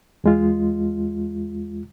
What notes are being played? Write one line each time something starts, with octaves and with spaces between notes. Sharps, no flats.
E2 G#3 F4